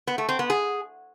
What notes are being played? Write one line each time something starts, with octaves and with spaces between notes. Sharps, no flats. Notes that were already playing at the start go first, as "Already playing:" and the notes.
B3
A3
C4
B3
G#4